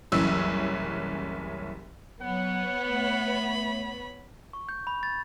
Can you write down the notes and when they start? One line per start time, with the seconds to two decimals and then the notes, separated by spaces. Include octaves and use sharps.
0.12 F#1 C2 E3 C#4 E6
2.22 F#3 B3 C#5 F#5
2.85 A3 B5
4.53 C#6
4.69 G6
4.87 B5
5.03 A6